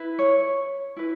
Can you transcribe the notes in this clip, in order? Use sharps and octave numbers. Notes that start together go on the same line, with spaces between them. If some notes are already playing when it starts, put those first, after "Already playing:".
Already playing: E4 B4
C#5
E4 B4